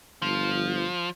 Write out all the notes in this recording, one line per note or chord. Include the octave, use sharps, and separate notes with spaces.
G1 F3